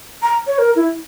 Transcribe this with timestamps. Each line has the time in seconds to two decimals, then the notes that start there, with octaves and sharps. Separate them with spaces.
0.22 A#5
0.47 C#5
0.59 A#4
0.76 E4